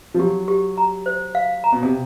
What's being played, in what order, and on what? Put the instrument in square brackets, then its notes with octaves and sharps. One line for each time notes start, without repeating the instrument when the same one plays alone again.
[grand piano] F3
[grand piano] F#3 [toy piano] G4
[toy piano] G4
A#5
C5
F5
A#5
[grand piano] B2
C3